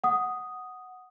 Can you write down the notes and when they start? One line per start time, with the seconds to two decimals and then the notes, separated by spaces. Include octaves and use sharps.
0.04 F#5 D#6